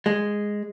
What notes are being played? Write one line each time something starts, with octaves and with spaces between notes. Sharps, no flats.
G#3